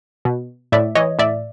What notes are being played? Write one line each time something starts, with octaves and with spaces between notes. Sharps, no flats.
B2
A2 D5 E5
E3 C#5 D#5
A2 D5 E5